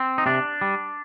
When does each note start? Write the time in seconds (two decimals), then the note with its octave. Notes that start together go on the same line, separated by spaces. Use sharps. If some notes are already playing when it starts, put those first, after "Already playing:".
Already playing: C4
0.18 D#4
0.26 C3 D4
0.61 G3